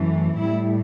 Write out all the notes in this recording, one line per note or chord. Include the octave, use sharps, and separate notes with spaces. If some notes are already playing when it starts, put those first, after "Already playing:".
Already playing: F#2 E3 A3
A2 G3 E4